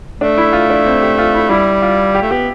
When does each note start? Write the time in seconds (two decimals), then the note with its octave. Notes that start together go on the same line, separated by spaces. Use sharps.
0.21 A3 D4
0.38 E4
0.53 F4
0.70 D4
0.86 C4
1.02 G4
1.18 F4
1.34 E4
1.50 G3 E4
1.82 F4
2.15 G4
2.22 A3
2.31 B3 G4